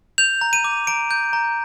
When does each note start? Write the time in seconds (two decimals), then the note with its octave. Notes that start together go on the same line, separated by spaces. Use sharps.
0.18 G6 F7
0.41 A#5
0.53 D#7
0.64 D6
0.87 A#5 D7
1.11 G6
1.33 A#5